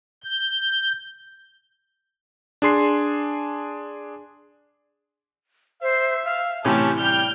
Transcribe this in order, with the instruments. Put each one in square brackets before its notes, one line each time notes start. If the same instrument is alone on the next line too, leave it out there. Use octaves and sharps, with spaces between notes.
[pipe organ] G6
[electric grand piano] D4 G#4 C6 C7
[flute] C5 [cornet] E5
[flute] F5
[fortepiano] A2 C3 E3 [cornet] C#4 [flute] G4 [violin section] A5
[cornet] G3 [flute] G5 [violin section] F6 G6